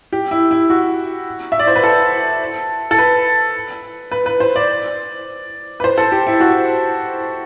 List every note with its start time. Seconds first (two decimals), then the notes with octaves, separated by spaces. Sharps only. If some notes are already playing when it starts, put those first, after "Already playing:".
0.13 G4
0.31 E4
0.51 E4
0.70 F#4
1.52 E5
1.59 D5
1.67 C5
1.76 B4
1.84 A4
2.91 A4
2.98 B4
4.12 B4
4.26 B4
4.40 C5
4.56 D5
5.80 B4
5.84 C5
5.98 A4
6.12 G4
6.27 E4
6.40 F#4